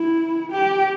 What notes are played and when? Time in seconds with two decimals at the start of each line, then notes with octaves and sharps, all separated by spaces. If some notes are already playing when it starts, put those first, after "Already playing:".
Already playing: E4
0.52 G4